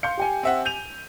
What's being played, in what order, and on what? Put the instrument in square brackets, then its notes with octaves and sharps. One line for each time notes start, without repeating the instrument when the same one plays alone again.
[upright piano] F5 [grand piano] C6 G6 C#7
[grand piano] G4 G5 G#5
[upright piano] C4 E5 F#5
G6 D#7 F7